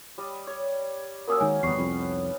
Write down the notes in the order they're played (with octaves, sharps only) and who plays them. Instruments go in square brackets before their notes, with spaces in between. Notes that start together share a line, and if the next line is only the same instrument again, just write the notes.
[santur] G3 D5 D#5
C#5 D5
[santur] F#3 A#3 C#4 [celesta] A#4 D#6 E6
[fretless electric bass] D#3 G#3 [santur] D#4 [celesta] G#5
[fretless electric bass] G1 E2 [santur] G3 B3 [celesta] C#6 C7
[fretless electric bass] C2 F2